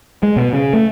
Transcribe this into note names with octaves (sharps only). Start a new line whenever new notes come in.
G#3
B2
C#3
A3